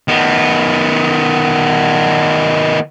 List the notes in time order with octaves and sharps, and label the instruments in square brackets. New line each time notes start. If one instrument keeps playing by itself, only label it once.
[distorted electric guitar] D#3 B3